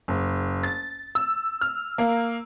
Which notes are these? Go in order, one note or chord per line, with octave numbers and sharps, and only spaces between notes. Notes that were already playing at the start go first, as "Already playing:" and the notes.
F#1
A6
E6
F6
A#3